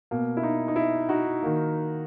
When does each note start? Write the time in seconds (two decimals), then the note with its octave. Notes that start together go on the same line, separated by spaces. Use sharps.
0.11 B2 A#3
0.37 E4
0.43 D#4
0.68 D#4
0.76 E4
1.09 D#4 F#4
1.43 D#3 A#3